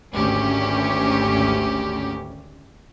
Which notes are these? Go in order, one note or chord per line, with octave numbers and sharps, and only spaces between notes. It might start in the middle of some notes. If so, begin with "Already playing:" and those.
G#1 D2 C#4 G4